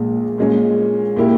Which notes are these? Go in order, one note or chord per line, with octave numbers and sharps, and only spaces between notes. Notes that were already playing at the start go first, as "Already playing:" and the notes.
Already playing: A#1 A#2 G#3
A#2 G#3 C#4
A#2 A#3 E4 G4